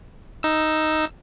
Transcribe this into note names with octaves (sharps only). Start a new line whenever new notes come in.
D#4 E6